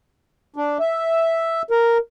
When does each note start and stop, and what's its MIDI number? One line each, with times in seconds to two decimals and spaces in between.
0.56 0.78 62
0.80 1.62 76
1.70 1.98 70